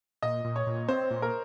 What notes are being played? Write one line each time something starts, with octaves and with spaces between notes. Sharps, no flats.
A#2 D#5
A#2
C#5
A#2
C4 C5
A#2
A#4